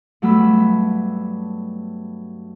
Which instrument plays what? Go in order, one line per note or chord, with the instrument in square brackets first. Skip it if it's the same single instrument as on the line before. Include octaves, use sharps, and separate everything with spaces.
[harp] G2 F#3 A3 B3 B5 E6